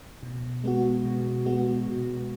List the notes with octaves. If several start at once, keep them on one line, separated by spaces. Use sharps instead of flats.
B2
G#3 B3 F#4
B2
G#3 B3 F#4
B2